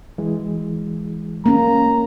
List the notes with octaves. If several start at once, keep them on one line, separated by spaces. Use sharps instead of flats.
E3 G#3
A#3 C#4 A#5